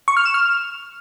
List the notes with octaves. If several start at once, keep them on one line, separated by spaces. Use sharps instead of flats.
C#6
F6
E7
F6